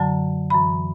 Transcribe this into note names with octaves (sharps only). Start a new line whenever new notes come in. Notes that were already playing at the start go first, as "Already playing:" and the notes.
Already playing: F#2 D3 F#3 A5
F#2 E3 B5